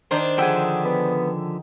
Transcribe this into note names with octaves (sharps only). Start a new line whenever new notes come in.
D#3 D4 C5
D3 F3 G#4 E5 F#5 G5
B3